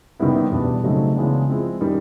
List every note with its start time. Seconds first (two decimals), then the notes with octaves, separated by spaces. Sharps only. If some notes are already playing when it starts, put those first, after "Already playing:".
0.19 C3 D#3 G3 B3 E4
0.51 E2 B2 G3 B3 D4
0.83 C#3 F#3 A3 C4 D#4
1.15 C#3 E3 G#3 B3 D4
1.48 F3 G#3 C4 E4 G#4
1.81 D#3 G3